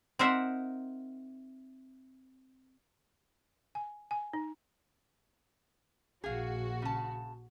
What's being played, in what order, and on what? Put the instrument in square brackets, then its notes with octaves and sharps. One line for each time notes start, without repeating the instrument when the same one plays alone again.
[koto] C4 D#4 A#4 C5 E5 F#5
[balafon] G#5
G#5
D#4
[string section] A#1 F#4 [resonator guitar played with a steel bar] G#4 F5
[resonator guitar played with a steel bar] C#3 A5